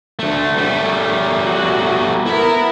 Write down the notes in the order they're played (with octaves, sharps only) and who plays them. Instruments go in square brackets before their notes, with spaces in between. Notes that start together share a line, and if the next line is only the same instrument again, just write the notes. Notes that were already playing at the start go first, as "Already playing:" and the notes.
[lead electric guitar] D2 A3
G3 A3
[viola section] F#4
[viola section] B3 A#4 [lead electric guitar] E4 B5